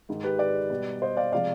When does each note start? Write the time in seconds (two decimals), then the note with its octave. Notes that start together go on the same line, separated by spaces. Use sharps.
0.09 G#2 D#3 G#3
0.24 G4 B4
0.39 B4 D5
0.70 B2 G3
1.02 C5 D#5
1.17 D5 F5
1.32 C3 F3 G#3 D5 F5